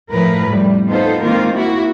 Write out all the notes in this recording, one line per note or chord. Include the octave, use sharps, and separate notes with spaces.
A2 F3 A#4 B4
F2 A2 G3
B3 D#4 F4 A4 C5
D#3 G#3 A#3 C4 F4 A#4
A#3 E4 F#4